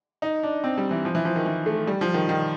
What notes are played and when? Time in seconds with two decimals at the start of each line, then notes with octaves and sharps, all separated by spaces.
0.22 D#4
0.43 D4
0.64 C4
0.78 G3
0.91 E3
1.05 F3
1.15 E3
1.25 F3
1.36 D#3
1.46 E3
1.66 A3
1.87 G3
2.01 F3
2.14 D#3
2.29 D#3